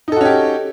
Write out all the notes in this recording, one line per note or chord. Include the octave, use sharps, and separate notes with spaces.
C#4 D#4 F#4 G4 A4